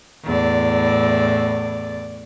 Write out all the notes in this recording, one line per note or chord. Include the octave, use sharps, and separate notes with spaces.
E2 A2 D5